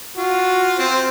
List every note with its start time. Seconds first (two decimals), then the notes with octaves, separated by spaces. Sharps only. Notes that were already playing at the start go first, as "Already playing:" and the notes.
0.17 F4 F#4
0.79 C4 C5